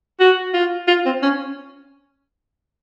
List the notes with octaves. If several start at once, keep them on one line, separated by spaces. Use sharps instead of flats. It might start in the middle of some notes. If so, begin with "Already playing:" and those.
F#4
F4
F4
C4
C#4